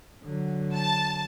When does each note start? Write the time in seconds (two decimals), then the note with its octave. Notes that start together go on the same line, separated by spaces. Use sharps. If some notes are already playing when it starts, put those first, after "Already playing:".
0.23 D3 F#3
0.76 A5